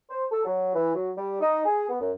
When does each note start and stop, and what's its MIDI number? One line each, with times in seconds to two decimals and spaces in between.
0.09 0.24 72
0.31 0.42 69
0.45 0.72 54
0.74 0.92 52
0.95 1.09 54
1.16 1.37 55
1.41 1.60 63
1.64 1.89 68
1.89 1.96 59
2.00 2.11 42